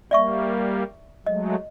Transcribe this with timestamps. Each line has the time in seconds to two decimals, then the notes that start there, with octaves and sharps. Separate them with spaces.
0.11 G3 A#3 D5 E5 C#6
1.26 F#3 G#3 A3 D#5